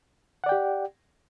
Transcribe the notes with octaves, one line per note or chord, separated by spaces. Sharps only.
G4 D5 F#5 G5